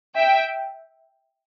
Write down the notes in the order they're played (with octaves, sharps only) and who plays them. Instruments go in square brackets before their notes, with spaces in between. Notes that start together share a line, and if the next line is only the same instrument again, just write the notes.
[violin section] E5 G5